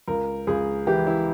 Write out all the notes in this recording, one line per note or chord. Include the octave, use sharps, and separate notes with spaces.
C#2 A#4
C#2 G#4
E3 G4
E4